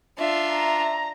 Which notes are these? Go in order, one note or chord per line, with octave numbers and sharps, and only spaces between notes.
D4 F4 E5
A#5